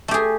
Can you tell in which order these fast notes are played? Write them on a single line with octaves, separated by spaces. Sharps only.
A3 G4 G#4